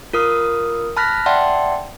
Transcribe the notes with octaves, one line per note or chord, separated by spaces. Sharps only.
F4 A#4 D#6 F6
A5 B5 F6 F#6 A#6 B6
D5 E5 F#5 G5 A5 C6